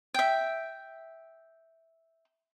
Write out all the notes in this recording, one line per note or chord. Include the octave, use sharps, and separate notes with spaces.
E5 G5